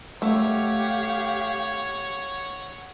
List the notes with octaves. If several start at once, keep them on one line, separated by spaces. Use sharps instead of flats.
A3 G4 C#5 F5 F#5